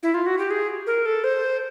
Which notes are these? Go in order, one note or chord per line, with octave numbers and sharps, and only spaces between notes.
E4
F4
F#4
G4
G#4
A#4
A4
C5